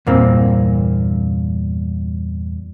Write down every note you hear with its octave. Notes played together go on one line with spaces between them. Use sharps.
E2 G2 A#2 A#3 C4